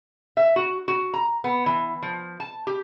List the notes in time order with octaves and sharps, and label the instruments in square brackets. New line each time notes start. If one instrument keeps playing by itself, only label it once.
[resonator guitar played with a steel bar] E5
F#4
F#4
A#5
B3
E3
F3
A5
G4